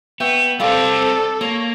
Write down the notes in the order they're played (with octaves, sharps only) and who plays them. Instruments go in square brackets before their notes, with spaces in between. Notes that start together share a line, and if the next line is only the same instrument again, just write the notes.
[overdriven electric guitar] B3 [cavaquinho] E5 G5 C#6
[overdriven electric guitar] G3 C4 [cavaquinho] F4 D5 D6 [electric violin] A4
[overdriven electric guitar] A#3 [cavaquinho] C#5